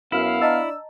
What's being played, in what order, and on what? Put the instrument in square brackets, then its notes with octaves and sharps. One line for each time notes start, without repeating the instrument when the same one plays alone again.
[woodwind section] F#2 [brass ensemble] B3 F5 [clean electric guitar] E4
[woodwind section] D4 E6 [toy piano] D#5 A5 A#5